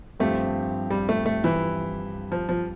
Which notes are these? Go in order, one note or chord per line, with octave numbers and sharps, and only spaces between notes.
G2 F3 A3 C4 G4
G3
A3
A3
E3
F3
F3